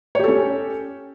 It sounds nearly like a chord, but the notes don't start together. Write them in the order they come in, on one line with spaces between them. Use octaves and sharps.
C#5 G4 A4 C#4